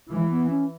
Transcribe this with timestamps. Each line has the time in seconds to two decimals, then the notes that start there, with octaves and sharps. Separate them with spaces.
0.11 E3 G#3
0.31 B3
0.50 C#4